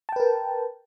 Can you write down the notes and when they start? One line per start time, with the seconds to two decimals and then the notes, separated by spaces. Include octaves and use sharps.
0.09 A5
0.12 G5
0.16 B4
0.20 A#4